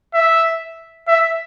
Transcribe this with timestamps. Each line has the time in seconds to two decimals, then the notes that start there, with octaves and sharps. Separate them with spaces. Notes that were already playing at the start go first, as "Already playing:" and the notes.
0.14 E5
1.08 E5